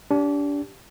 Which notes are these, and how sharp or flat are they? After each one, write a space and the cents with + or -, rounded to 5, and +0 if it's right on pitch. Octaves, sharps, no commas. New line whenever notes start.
D4 -30 G4 +0